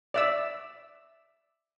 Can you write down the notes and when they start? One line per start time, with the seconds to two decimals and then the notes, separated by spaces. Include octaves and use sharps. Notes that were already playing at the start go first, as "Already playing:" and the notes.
0.14 D5 E5 E6